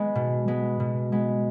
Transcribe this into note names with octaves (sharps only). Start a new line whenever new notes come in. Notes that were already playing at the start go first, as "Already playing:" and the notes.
Already playing: G#3 B3
B2
G#3 B3
B2
G#3 B3